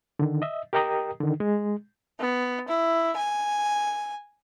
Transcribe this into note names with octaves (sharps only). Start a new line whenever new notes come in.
D3 D#3
D#5 E5
G4 A#4 D#5 G5 A#5 D#6
D3 D#3
G#3
B3
E4
G#5